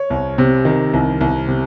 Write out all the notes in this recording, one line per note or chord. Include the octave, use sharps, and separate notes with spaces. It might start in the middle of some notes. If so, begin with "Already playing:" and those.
Already playing: C#5
C2
C3
D#3
C2
C2
C3